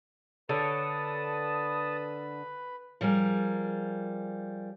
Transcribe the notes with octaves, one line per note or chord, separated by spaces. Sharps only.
D3 A4 B4 C#5 A5 B5 D#6
F3 G3 G#4 A#4